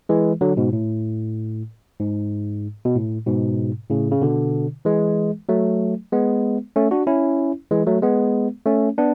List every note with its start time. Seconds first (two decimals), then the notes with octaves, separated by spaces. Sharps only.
0.09 E3 G#3
0.41 D3 F#3
0.57 G#2 B2
0.73 A2
2.00 G#2
2.85 B2
2.95 A2
3.26 G#2 B2
3.90 A2 C#3
4.12 C#3
4.22 B2 D3
4.85 E3 G#3
5.49 F#3 A3
6.12 G#3 B3
6.76 A3 C#4
6.91 D4 F#4
7.07 C#4 E4
7.71 E3 G#3
7.87 F#3 A3
8.02 G#3 B3
8.66 A3 C#4
8.98 B3 D4